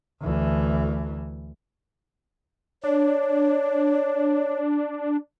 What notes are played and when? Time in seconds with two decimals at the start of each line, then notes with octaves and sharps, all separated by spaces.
0.22 D2 E3
2.83 D4 C#5